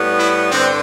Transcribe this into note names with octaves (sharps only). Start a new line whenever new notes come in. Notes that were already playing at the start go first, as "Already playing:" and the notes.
Already playing: A2 G3 B3
E4
G2 D3 C4